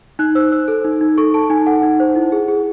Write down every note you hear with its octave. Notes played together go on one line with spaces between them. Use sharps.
D#4 F#6
C5 E6
C5 E6
A4
D#4
D#4
A4 C#6
A4 A5
D#4 G#5
A4 F#5
D#4
C5
E4
G#4
G#4